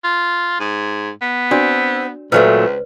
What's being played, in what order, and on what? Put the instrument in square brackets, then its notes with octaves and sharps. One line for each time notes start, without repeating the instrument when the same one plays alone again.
[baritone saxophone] F4
G#2
B3
[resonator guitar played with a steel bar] C4 [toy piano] D4 F#4 D5
[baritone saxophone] C#2 [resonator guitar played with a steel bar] A#2 F#3 A3 [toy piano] B4 C5 D5